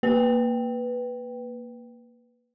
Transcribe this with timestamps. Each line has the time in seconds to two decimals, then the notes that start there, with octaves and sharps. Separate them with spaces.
0.03 A#3 B4 G5